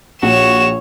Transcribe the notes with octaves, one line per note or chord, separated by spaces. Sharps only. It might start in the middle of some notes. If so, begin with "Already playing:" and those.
A#1 F#4 C#5 E7